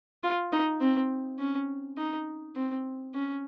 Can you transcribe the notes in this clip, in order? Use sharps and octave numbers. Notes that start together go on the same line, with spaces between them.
F4
D#4
C4
C#4
D#4
C4
C#4